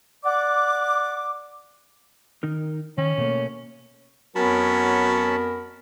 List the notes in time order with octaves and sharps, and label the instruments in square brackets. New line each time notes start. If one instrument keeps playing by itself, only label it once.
[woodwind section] D5 F#5 D6
[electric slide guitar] D#3 D#4 A#4
[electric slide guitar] D#3 [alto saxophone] C#4
[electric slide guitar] B2 A3 A#3
[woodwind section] F2 B3 A#4 [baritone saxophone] F#3 [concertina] C#4 A5 B5